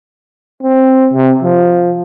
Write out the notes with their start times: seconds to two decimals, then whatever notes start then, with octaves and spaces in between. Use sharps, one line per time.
0.63 C4
1.13 C3
1.43 F3